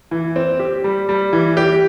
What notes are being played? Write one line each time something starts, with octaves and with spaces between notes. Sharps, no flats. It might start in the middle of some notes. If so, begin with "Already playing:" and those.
E3
C4
G4
G3
G3
E3
G4